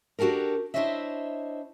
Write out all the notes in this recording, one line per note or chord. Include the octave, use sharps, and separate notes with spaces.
D4 F#4 G4 A4 A#4
D4 E4 C5 C#5 D#5 E5